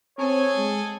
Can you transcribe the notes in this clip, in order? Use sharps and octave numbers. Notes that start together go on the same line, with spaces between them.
C4 G#4 A4 C#5 G#5
G#3